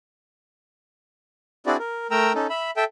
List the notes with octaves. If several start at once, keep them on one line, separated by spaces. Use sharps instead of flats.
C4 D4 E4 F#4 G#4 D5
A#4
A3 A#4 G5 A#5 E6
C#4 D#4 A4
E5 B5
A4 E5 G5